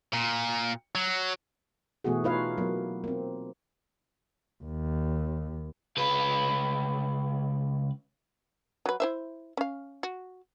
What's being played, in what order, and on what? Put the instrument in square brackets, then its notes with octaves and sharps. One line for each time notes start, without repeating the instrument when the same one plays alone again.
[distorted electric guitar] A#2
F#3
[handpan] B2 E3 A3 B3 F#4 G#4
D#4 F4 B4 C#5 F5
F#3 A#3 B3
A#3 C4
[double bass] D#2
[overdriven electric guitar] C#2 B4
[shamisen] F#3 B4
E4 C5 E5
C#4 F5
F#4